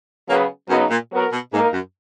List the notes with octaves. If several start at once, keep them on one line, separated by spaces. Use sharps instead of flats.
C#3 F#3 A#3 B3
F#2 C#3 F#3 B3 D#4
A#2
F#3 B3 F#4 A#4
B2
G#2 A#3 D#4 A#4
F#2